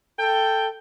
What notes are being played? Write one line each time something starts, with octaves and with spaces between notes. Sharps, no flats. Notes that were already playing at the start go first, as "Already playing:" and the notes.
A4 G5